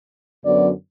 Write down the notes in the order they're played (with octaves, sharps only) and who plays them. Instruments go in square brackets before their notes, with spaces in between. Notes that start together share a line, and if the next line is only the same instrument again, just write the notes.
[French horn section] F#2 D3 F#3 B3 D5